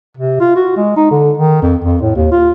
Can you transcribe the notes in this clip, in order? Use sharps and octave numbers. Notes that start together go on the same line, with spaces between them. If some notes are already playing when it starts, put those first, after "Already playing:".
C3
F4
F#4
G#3
D#4
D3
D#3
F2
F2
A2
D#2
F4